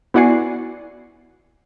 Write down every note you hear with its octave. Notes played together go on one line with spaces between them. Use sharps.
B3 E4 F#4 D5 G#5 C7